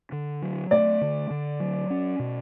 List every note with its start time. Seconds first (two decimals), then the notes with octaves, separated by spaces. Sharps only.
0.12 D3
0.42 F#3
0.71 A3 D5
1.01 D3
1.30 D3
1.60 F#3
1.90 C#4
2.19 B2